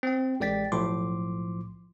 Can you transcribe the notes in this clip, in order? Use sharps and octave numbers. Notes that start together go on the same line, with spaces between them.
C4 G5
A1 G#3 D5 G5 A6 B6
B1 A2 F3 C6 D6